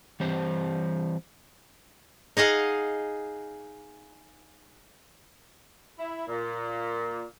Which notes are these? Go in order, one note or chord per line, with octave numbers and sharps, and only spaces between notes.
E3 G3 C4 C5
D#4 G#4 D#5 F5 F#5
E4
A#2